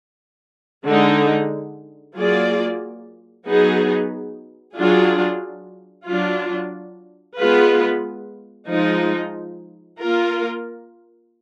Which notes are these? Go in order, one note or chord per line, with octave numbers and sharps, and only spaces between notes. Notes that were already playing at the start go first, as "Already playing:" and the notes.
D3 G#3 D#4
F#3 A#3 F4 G#4 D5
F#3 B3 D#4 G#4
F#3 D4 F4 G#4
F#3 D4 F4
G#3 B3 F4 G#4 B4
F3 G#3 D#4
A#3 F4 A#4